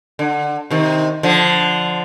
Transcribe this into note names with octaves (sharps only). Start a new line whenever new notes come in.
D3
C3 D#3
D3 F3